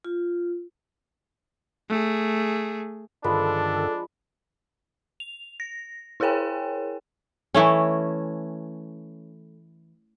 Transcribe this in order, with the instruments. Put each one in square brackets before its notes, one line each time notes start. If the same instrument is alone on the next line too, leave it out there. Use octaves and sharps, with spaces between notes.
[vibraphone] F4
[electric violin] A3 G#4
[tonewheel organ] G2 D3 D#3 [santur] F3 G#3 B4 [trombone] D4 [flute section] A4
[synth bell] F7
A#6
E4 G#4 A#4 C#5 G5 G#5
[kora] E3 A3 C#4